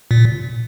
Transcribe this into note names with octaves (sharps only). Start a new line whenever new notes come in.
A#2